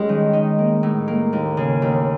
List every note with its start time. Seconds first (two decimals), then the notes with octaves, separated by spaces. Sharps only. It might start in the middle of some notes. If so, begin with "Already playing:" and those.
Already playing: G3 G#3 C#4
0.09 D#3
0.33 D#4
0.59 A#3
0.83 A2
1.08 A#3
1.33 D#2
1.57 C#3
1.82 D#2